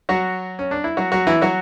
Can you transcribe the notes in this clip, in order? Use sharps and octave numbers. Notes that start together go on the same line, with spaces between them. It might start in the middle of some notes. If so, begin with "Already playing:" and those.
F#3 F#4
C#4
D4
E4
F#3 F#4
F#3 F#4
E3 E4
F#3 F#4